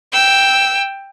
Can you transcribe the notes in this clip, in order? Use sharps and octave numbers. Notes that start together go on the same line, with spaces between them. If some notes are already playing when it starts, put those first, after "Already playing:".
G5 E6